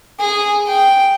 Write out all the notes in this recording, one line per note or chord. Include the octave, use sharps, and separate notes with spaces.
G#4
G5